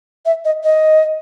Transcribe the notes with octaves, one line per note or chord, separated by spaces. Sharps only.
E5
D#5
D#5